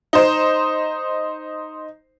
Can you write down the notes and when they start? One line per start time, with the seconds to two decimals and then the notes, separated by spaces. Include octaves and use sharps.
0.13 D#4 C5